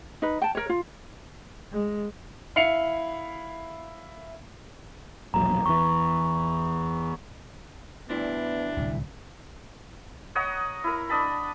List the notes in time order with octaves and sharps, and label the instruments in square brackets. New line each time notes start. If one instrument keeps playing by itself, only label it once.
[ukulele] D#4 B4
G5 A5
A#4 C#5
F4
[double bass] G#3
[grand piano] E4 F5 C7 C#7 F7
[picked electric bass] E1 A#1 F#3 [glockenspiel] A#5
[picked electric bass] E2 E3 [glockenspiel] C#6
[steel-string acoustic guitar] D2 G2 E4 [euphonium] B3 [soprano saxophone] D4
[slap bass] D1 C2 A#2
[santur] C#5 D#5 F#5 A#5
E4 A#4
D4 D#5 A5 B5